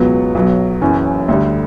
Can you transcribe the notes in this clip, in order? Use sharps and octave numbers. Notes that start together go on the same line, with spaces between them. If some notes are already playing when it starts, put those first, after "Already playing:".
Already playing: C#2 B2 F#3 B3
B1 B2 F#3
F#1 F#2 E3 C#4
D2 D3 G3